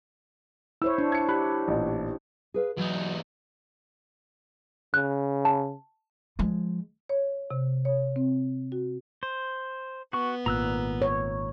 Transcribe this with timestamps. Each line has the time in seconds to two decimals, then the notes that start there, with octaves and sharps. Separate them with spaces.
0.82 E4 C5 C#5 E6
0.98 D4
1.12 G#6 C#7
1.29 G4 B5 F#6
1.68 A1 A#2
2.54 G#4 B4 F5
2.77 E2 F#3 D#4
4.94 C#3 F#6
5.45 A5
6.39 F3 G#3
7.09 C#5
7.51 C3
7.85 C#5
8.16 C4
8.72 F#4
9.23 C5
10.13 B3 F#4 C#6
10.46 G#1 A#2 A#5 E6 F#6
11.02 C#5